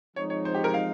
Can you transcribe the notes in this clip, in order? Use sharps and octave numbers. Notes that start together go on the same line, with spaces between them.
F3 G#3 C4 D#4 C#5
C#5
C5
G4
A#4
F5